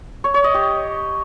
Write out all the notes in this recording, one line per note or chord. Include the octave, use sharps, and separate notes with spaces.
C#5
C#5
D#5
G4